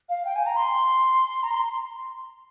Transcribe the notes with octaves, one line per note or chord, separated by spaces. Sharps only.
F5
G5
G#5
A#5
C6
A#5
C6